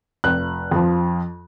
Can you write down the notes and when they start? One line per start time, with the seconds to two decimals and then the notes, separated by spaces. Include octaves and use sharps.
0.24 F1 F#6
0.71 F2 F3